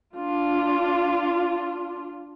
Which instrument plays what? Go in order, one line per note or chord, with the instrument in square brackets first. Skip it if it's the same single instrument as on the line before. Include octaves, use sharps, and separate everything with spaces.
[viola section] D4 F4